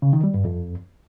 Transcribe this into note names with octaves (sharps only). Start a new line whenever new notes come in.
C#3
D#3
G3
G2
F2